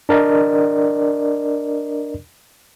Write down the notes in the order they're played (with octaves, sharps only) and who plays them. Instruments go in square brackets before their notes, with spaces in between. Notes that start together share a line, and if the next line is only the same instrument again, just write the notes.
[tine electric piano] D4 A#4 D5 D#5